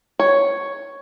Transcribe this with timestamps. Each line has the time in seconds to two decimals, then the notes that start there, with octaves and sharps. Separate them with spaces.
0.19 C#5